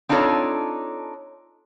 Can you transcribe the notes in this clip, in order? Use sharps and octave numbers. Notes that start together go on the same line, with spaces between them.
C4 D4 D#4 F4 A4 C#5